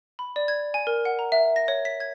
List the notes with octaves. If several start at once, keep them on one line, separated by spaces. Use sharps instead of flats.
B5
D5
G#6
G#5
A#4
F#5
A#5
E5
A#6
C#5
B6
G#6